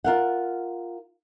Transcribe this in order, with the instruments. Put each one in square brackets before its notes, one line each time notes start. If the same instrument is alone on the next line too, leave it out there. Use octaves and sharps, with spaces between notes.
[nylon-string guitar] F4 A#4 F#5